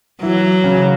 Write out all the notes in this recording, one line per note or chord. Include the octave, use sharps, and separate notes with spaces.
E3 F#3 E4
C#3 C#4